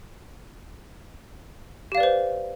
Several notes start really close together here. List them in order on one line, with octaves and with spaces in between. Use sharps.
G4 F5 D5 B4 C5